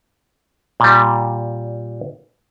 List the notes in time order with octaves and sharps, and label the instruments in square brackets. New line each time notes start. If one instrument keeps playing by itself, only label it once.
[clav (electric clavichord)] A#2 G3